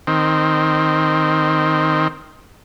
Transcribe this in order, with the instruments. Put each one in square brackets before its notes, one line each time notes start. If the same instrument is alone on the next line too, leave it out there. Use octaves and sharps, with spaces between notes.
[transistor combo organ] D#3 C4